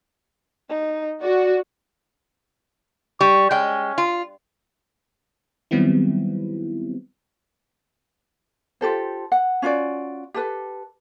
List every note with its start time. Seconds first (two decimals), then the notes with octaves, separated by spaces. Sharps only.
0.69 D#4
1.22 F#4 D5
3.21 G3 C#6
3.51 G#3 C#4 G5
3.98 F4
5.71 D#3 F#3 G3 B3 C4 E4
8.81 F4 G4 A4 C5
9.32 F#5
9.62 C#4 F4 F#4 D5
10.34 G4 A4 B4